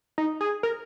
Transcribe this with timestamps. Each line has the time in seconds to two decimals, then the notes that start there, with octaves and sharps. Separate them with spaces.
0.18 D#4
0.41 G#4
0.63 A#4